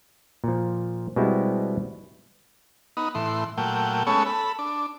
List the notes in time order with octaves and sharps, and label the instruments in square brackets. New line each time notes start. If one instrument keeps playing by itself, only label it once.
[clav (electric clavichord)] A#2 F3
B2 G3 G#3 B3 C4 E4
[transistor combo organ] B3 D#4
A2 E3 C6
A#2 F#3 A3 G5
G#3 A3 B3 C#4 A4 C#5
A4 B5
D4